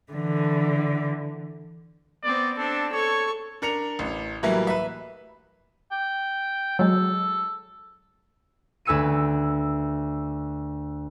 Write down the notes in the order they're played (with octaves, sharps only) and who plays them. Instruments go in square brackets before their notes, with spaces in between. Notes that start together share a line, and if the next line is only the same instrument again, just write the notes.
[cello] D3 E3
[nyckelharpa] B3 C4 [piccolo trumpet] D5
[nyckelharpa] C4 D4 [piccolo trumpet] A4
[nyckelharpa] A4 C#6 [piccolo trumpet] C#5
[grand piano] D4 A#4 C#7 F7
A1
A2 E3 F#3 G3 A#3 E4
B4 E5
[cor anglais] G5
[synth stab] F#3 G#3 [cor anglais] A4
[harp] D2 B4 G#5 E6 C#7 D#7